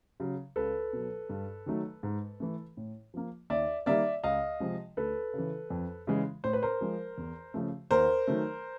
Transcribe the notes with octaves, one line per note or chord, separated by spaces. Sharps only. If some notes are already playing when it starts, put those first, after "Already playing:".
C#3 F#3
C#2 A4 B4
B2 F#3
G2
D#3 F#3 A3
G#2
E3 A3
A2
F3 A#3
D#2 D5 E5
D#3 G3 A#3 D5 E5
C#2 D#5 F5
C3 F3 G#3
D2 A4 B4
C#3 E3
F2
C#3 E3 G#3
A2 C5
B4
A#4 C5
F3 G#3
E2
C#3 F3 A3
D#2 A#4 C5
D#3 F#3 A3